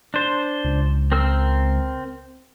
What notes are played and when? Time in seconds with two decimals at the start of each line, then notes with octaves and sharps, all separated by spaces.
0.14 D4 C5
0.64 C#2
1.12 C4 A#4 E6